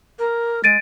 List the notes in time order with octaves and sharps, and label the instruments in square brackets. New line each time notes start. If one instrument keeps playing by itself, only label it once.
[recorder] A#4
[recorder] G#3 [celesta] A6 D7 D#7